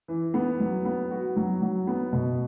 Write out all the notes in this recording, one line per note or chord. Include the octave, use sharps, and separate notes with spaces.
E3
B3
F#3
B3
F#4
F#3
F#3
B3
B2